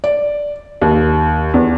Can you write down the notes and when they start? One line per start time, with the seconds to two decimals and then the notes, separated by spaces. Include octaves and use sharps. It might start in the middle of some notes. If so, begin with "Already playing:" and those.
0.04 D5
0.81 D#2
1.54 E2